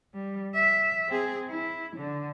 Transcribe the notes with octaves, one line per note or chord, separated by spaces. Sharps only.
G3
E5
C4 G#4
E4
D3